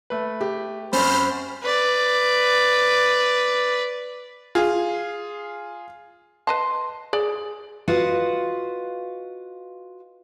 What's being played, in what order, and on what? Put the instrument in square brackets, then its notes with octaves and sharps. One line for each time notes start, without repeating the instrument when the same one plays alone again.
[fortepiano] A3 B4
[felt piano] G4
[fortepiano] F#2 C4 [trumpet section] F#4 B5 [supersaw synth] C5 F6
[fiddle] B4 D5
[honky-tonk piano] F4 G#4
[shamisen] B4 D#5 A5 [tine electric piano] C6
[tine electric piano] G#4 [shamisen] D5
[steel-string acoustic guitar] F4 F#4 B4 D#5 F5 F#5